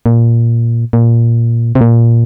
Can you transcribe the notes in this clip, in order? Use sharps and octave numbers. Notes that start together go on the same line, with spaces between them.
A#2
A#2
C3
A#2